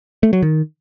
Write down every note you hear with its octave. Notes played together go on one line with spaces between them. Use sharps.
A3
F#3
D#3